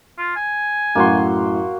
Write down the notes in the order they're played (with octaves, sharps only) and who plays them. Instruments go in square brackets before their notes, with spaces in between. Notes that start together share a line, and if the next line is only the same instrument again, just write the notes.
[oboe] F4
G#5
[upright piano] F#2 A2 [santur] A#3 F#4 C6